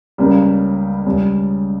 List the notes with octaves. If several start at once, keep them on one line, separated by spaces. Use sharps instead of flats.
C#2 C#3 G3 A#3
C#2 C#3 G3